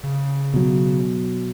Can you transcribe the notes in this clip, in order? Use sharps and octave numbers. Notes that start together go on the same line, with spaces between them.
C#3
B2 F#3